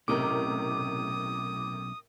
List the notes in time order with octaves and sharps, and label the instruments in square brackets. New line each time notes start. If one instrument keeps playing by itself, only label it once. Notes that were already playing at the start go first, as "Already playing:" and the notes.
[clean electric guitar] B1 C#4 D#5 [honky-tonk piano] A2 C3 A#4 [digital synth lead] D6 [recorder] D#6